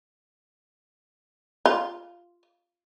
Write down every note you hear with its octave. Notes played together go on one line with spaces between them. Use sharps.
F4